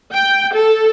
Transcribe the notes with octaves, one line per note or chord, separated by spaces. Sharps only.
G5
A4